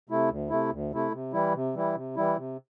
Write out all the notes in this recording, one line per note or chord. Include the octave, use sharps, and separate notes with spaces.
C3 A3 E4
D2
C3 A3 E4
D2
C3 A3 E4
C3
E3 G3 E4
C3
E3 G3 E4
C3
E3 G3 E4
C3